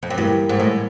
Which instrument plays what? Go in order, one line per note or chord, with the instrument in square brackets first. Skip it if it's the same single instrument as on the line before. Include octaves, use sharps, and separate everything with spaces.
[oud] F2
F#2
[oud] G2 [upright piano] E3 G3 A#3
[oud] G#2
A2